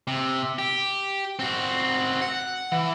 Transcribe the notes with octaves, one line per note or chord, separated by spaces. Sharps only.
C3
G4
C4 F#4
F#5
E3